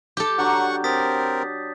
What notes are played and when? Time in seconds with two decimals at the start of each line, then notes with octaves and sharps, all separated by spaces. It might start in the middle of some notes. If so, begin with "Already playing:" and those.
0.17 G4 A4 G6
0.38 F#3 D4 F#5 C#6
0.84 C4 A#4 D#6 A6 B6